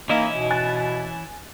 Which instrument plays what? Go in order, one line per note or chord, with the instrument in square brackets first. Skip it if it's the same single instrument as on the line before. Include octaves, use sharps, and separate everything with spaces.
[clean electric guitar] E3 C#4 E4 [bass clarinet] A#3 [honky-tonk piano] D#4
[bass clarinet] B2
[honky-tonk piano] G#5 F#6 A6